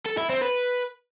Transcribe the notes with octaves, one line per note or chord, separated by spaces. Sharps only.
A4
E4
C4
B4